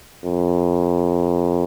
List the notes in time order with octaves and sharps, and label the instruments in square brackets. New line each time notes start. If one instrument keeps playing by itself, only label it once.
[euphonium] F2